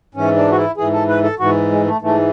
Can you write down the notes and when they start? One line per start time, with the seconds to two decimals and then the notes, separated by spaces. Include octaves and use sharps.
0.15 G#2 E3 C#4
0.36 D4
0.51 F#4
0.57 E4
0.77 G#2 E3 G#4
0.93 A4
1.09 B4
1.24 A4
1.39 G#2 E3 F#4
1.71 G#3
1.86 A3
2.02 G#2 E3 A3